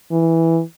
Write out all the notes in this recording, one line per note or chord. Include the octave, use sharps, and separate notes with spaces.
E3